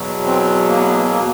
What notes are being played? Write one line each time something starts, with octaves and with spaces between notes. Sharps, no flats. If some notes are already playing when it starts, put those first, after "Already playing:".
Already playing: E2 B2 F#3
C4
A#3
B3
A#3
A#3